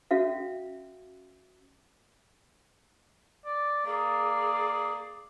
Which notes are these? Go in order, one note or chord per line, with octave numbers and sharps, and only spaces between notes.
C#4 F#4 E5 F5
D5
A#3 G#4 D5